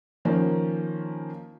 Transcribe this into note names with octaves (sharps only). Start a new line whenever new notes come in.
D#3 F3 A#3 C#4